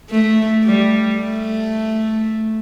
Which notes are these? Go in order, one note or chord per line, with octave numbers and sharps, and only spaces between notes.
A3
G3
A3